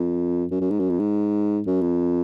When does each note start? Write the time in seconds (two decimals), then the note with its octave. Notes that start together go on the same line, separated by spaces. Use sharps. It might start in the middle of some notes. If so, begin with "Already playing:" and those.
Already playing: F2
0.51 F#2
0.61 F#2
0.70 G#2
0.80 F#2
0.90 F2
0.99 G#2
1.67 F#2
1.81 F2